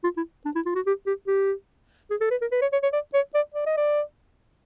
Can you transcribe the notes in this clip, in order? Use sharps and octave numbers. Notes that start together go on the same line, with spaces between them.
F4
E4
D4
E4
F4
F#4
G4
G4
G4
G#4
A4
B4
A#4
B4
C#5
C#5
C#5
D5
C#5
D5
D5
D#5
D5